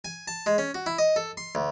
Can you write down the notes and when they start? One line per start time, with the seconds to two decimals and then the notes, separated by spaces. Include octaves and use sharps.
0.05 G#5
0.28 A5
0.46 G#3
0.58 C#4
0.75 F#4
0.86 E4
0.99 D#5
1.16 A4
1.37 C6
1.55 D2